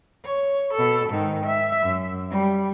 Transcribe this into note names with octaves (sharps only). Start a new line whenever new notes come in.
C#5
B2 A4
G#2 D#3
E5
F#2
G3